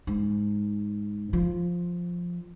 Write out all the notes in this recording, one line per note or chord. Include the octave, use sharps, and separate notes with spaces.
G#2
F3